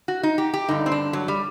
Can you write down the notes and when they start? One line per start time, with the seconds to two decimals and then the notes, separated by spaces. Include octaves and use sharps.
0.08 F#4
0.23 D#4
0.38 G4
0.54 G4
0.68 G2 D3 D#4
0.86 C4
0.92 D4
1.13 F#3
1.28 G3